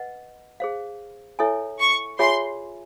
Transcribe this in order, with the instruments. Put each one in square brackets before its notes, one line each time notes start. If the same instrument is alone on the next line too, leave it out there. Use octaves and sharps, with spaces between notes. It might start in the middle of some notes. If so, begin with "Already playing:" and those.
Already playing: [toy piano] B4 D#5 F#5
G#4 C5 F5
E4 A4 C#5 E5 G#5
[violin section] C#6
[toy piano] F4 G#4 C#5 E5 G#5 [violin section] C6